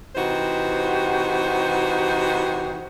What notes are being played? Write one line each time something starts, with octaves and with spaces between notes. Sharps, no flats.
C3 E3 D#4 F#4 G4 C5